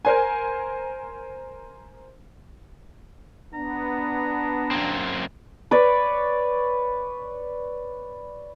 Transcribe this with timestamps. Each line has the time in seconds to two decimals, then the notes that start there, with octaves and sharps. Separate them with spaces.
0.05 A#4 C5 G#5
3.54 B3 D4 A#5
4.71 F#2 A#3 C4
5.71 B4 C#5 D5